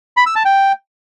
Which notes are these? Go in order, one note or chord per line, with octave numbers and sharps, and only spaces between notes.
B5
E6
A5
G5